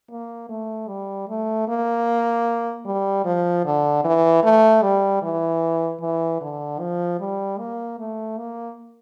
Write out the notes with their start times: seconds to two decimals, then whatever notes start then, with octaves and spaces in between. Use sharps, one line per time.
0.10 A#3
0.49 A3
0.88 G3
1.29 A3
1.68 A#3
2.85 G3
3.25 F3
3.65 D3
4.05 E3
4.43 A3
4.82 G3
5.22 E3
6.01 E3
6.41 D3
6.80 F3
7.20 G3
7.59 A#3
7.99 A3
8.38 A#3